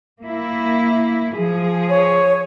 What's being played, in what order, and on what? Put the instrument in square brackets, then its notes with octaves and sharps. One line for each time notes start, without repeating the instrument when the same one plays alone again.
[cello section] A#3 E4
F3 G#4
[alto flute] C#5